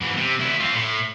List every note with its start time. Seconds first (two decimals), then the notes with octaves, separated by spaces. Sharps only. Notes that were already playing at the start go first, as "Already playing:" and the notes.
0.01 G#2 E3
0.17 C3
0.39 D2 E4
0.60 C4 F4
0.73 A2